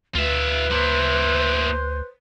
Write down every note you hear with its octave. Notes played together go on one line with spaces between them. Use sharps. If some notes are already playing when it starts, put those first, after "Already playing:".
D2 F4 B4 E5
A#3 E4 C5